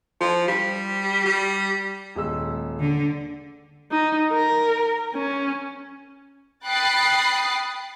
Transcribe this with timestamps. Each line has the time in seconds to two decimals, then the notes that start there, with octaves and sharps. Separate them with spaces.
0.21 F3
0.48 G3
1.26 G3
2.15 D#1 G#3 E6
2.80 D3
3.91 D#4
4.32 A#4
5.14 C#4
6.65 G5 B5 D#6 F#6 A6 C7